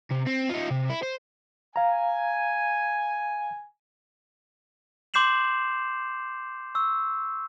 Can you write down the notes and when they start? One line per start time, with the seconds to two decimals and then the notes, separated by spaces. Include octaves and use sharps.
0.11 C3
0.27 C4
0.50 D#4 F4
0.70 C3
0.89 E4
1.02 C5
1.76 F5 G#5 A#5
5.14 C6 D6 G6 C7 E7 F#7
6.75 C#6 E6